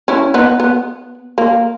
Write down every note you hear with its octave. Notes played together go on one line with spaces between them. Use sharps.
C#4 E4
B3 D#4
B3
A#3